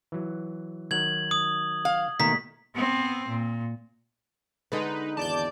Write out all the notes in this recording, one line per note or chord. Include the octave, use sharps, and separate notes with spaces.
E3 F#3
D#3 F#3 F#5 G#6 F#7
D#6
F5
B2 D#3 A3 A#3 B6
B3 C4
A#2
D3 G#3 B3 D#4 B4
G#1 E2 D5 A5 D6 G6